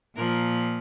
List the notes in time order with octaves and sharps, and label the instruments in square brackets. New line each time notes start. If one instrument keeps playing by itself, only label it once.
[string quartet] A#2 F3 A#4